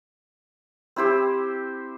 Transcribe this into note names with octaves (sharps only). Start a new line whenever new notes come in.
C4 E4 G4 C5